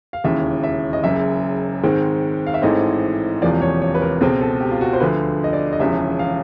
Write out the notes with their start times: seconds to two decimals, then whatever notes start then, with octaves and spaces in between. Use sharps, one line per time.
0.13 F5
0.24 E1 D#2 C#3 E3 E5
0.64 E5
0.93 D#5
1.04 F#1 F#2 C#3 E5
1.83 G#2 D#3 G#3 C4
2.47 F5
2.54 E5
2.62 A1 G#2 E3 A3 C4 D#5
3.42 E1 E2 C3 F3 A#3 D5
3.62 C#5
3.82 C#5
3.95 B4
4.02 A#4
4.21 C#2 B2 G#3 C4 A4
4.41 A4
4.61 G4
4.71 F4
4.81 F#4
4.93 C5
5.00 D2 D3 F3 B4
5.44 D#5
5.53 D5
5.73 D#5
5.80 E1 E2 C#3 F3 E5
6.19 F5